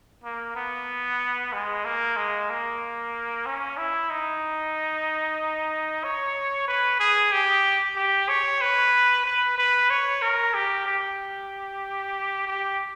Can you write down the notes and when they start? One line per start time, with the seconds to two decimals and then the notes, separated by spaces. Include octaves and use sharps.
0.24 A#3
0.56 B3
1.53 G#3
1.85 A#3
2.17 G#3
2.50 A#3
3.46 C#4
3.78 E4
4.10 D#4
6.04 C#5
6.68 B4
7.00 G#4
7.32 G4
7.96 G4
8.29 C#5
8.61 B4
9.26 B4
9.58 B4
9.90 C#5
10.22 A#4
10.54 G4
10.87 G4
12.47 G4